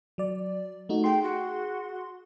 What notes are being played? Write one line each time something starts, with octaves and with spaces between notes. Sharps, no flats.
F#3 D5
A3 D#4 F#4
G#4 G5 C6
F#4